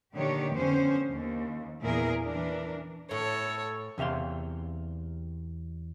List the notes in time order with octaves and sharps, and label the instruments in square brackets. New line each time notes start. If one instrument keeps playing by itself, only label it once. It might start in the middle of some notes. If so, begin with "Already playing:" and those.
[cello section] A#2 D3 D#3 D4 G4 C#5
F2 D3 B3 C#4 C5
D#2
E2 A#2 E4 G#4 A#4
E3 D4 A#4
[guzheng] A2 [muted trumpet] A4 [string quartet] C#5
[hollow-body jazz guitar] E2 C3 E5 F5 C6